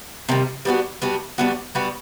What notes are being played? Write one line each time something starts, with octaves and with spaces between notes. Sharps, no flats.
C3 D#3 G3
G3 B3 D4 F#4
G3 B3 D4 F#4
G3 B3 D4 F#4
G3 B3 D4 F#4